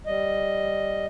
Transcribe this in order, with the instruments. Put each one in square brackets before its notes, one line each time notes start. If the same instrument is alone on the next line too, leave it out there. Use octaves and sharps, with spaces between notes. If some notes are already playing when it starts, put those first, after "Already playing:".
[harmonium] G3 D#5